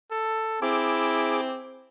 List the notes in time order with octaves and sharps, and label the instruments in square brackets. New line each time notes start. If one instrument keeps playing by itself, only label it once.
[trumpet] A4
[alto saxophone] C4 [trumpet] E4 [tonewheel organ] G#4 D6